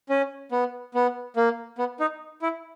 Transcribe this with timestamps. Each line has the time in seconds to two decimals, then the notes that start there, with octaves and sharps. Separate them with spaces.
0.09 C#4
0.52 B3
0.94 B3
1.36 A#3
1.78 B3
2.00 D#4
2.42 E4